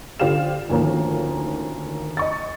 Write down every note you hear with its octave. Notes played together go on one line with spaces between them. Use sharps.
D3 F4 G4 C5 F5 E7
D2 D#3 F3 A#3 C#4
D#5 C#6 A6